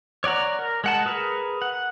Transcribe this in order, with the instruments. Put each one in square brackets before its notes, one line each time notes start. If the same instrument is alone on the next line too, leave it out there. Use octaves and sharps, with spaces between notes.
[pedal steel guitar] C#5 D5 F#5 A#5
A#4
G#3 F#5 A5
G#4 A#4 B4
F#5